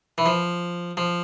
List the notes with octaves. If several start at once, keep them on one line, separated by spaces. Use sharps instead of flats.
E3
F3
F3